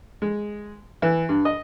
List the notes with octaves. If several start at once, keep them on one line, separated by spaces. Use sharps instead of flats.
G#3
E3
G2
D#5